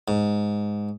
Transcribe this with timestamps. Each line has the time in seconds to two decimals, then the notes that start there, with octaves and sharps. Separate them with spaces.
0.08 G#2